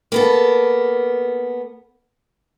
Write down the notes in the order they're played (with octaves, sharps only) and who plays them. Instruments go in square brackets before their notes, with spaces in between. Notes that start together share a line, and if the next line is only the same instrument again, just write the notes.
[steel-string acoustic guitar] A#3 B3 A4